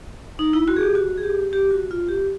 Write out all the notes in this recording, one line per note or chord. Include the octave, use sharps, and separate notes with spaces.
D#4
E4
F#4
G#4
G4
F#4
G#4
G4
G4
F#4
F4
G4